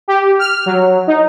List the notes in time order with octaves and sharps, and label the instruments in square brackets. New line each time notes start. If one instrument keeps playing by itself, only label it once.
[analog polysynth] G4
F6
F#3
D#4